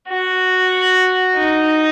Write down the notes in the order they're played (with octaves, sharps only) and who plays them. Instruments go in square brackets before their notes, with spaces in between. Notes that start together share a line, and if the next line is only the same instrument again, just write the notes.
[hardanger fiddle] F#4
D#4